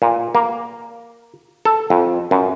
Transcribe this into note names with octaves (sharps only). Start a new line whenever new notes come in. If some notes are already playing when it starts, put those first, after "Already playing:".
A#2
A#3
A4
F2
F#2